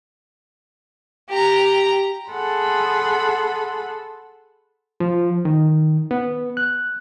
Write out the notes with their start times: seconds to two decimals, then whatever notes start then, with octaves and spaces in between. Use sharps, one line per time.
1.29 G4 A#5
2.32 G#4 A4 F#5 B5 C6
5.00 F3
5.45 D#3
6.11 B3
6.57 F#6